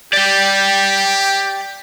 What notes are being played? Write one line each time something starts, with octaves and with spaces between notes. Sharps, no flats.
G4 D5 G5